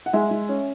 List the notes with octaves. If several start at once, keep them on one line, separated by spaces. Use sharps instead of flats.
F#5
G#3 E5 G#5
G#3
C#4